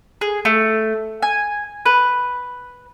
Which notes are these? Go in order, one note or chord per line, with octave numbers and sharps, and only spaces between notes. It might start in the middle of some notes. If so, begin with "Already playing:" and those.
G#4
A3
G#5
B4